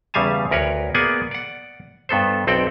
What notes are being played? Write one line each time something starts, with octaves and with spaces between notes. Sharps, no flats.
E2 C#3 G3 F5 G#5 A5
D2 A#4 B4 C#5
A#3 B3 G#4 D5 F#5 G#5
D5 F#5
G2 B3 A4 C5
B1 C4 A4 D5 G5